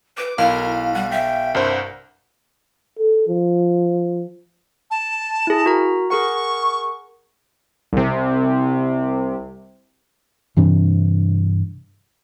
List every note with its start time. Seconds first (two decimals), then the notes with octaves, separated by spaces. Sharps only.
0.18 B4 D6
0.38 B1 E4 A#4 F5
0.94 G3 F#5
1.11 E5 G5
1.55 C2 G2 A#4 C5
2.99 A4
3.28 F3
4.91 A5
5.47 E4 G#4
5.66 F#4 A#4 A#5
6.10 G#4 A#4 F#5 C#6
7.93 C2 C3
10.57 G2 C3 E3 D4